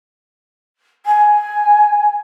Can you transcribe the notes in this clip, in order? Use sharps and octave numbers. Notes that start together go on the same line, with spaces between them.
G#5